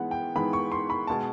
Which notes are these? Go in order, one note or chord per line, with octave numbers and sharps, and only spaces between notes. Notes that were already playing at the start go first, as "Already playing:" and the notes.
Already playing: G#2 E3 G#3 B3 F#5
G5
G#2 E3 G#3 B3 B5
C#6
C6
B5
B2 G#3 A5